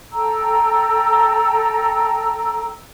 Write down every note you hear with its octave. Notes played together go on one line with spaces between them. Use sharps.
A4 G5 A#5 E6